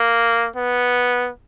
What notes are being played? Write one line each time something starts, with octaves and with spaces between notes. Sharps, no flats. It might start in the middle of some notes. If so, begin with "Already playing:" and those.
Already playing: A#3
B3